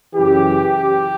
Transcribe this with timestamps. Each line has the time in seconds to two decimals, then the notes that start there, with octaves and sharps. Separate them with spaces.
0.15 F#2 C#3 E3 G4
0.83 G4